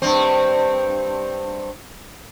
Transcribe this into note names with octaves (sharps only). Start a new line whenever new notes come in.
G2 C4